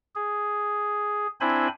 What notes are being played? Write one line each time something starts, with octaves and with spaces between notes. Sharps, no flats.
G#4
C4 D4 E4 C5 G#5 B5